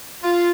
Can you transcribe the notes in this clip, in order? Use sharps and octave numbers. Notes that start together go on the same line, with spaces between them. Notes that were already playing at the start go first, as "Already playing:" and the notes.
F4